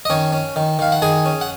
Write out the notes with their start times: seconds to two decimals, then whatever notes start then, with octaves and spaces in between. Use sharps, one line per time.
0.05 D#5
0.10 D#3 C#4 C#5
0.33 C#4
0.56 D#3
0.79 D#3 F5
0.92 F#5
1.02 D#3 G#4 G#5
1.26 C#4
1.41 F#5